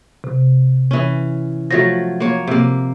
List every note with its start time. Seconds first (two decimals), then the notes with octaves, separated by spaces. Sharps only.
0.24 C3
0.91 E3 C#4
1.71 F3 F#3 A3 A#6
2.20 A#3 C#5
2.47 C3 A#3